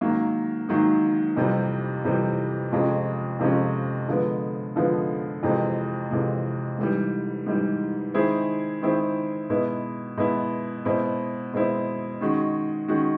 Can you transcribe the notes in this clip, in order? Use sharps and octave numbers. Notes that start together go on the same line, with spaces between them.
G#2 D#3 F#3 A#3
G#2 D#3 F#3 A#3
F2 C3 E3 G3
F2 C3 E3 G3
F2 C3 F3 G#3 C#4
F2 C3 F3 G#3 C#4
D3 F3 G#3 B3
D3 F3 G#3 B3
F2 C3 E3 G#3
F2 C3 E3 G#3
G#2 E3 G3
G#2 E3 G3
D#3 G#3 C4 E4 G#4
D#3 G#3 C4 E4 G#4
B2 G#3 B3 E4
B2 G#3 B3 E4
B2 G#3 C4 E4
B2 G#3 C4 E4
D#3 G#3 C#4 F#4
D#3 G#3 C#4 F#4